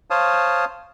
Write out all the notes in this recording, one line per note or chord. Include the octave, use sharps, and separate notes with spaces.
C5 C#5 F5 A5 D#6